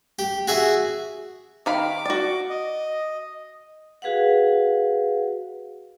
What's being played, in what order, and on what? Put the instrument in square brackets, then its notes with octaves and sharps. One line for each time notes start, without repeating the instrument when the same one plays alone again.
[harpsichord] G4
F#4 G#4 E5
[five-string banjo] D#3 F5 B5 [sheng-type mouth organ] D6
[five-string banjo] F#4 D5
[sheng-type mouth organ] D#5
[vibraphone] F#4 G#4 B4 F5 F#5